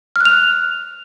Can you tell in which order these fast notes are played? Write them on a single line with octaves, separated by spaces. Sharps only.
F6 F#6 F7